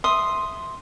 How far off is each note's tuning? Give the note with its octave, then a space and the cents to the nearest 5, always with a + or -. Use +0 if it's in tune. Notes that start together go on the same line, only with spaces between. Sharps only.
E5 +0 C6 +0 D#6 +0